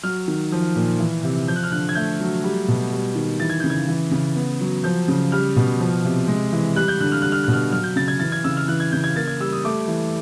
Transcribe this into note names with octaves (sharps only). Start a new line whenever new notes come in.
F#3 F6
D#3
F3
A#2
E3
C3
F3 G6
F#6
F6
D3 F#6
G#6
A3 G6
F#3
G3
B2
G3
D#3
E3 A6
G#6
C#3 G6
G#6
E3
C#3
B3
F#3
F3 G6
C#3
G3 F6
B2
F3
C3
G#3
E3
G3 F#6
G6
D3 F#6
F6
G3 F#6
F6
B2 F#6
F6
F#3 F6
G6
C#3 A6
G#6
E3 A6
G#6
C#3 E6
F6
E3 F#6
G#6
C#3 G6
G#6
A#3 A6
G#6
G3 E6
D#6
A3 D6
E3